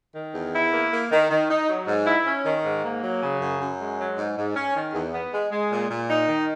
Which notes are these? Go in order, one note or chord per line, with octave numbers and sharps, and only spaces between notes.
D#3
E2
E4
A#3
A#3
D#3
D#3
D#4
F#3
G#2
E4
C#4
D#3
G#2
A#3
F#3
C#3
F#2
F#2
G#3
F#3
G#2
G#2
C#4
D#3
E2
B3
G#3
G#3
A#2
A#2
D#4
D#3